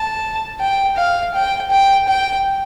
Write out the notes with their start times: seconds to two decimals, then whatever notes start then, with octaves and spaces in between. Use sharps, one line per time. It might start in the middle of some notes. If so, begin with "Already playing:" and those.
Already playing: A5
0.60 G5
0.97 F5
1.34 G5
1.71 G5
2.08 G5